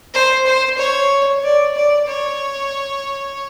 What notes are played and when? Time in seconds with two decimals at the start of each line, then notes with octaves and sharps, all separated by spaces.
0.14 C5
0.46 C5
0.78 C#5
1.43 D5
1.75 D5
2.08 C#5